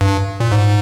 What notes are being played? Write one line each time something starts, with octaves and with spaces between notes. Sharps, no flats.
G2
A#2
G#2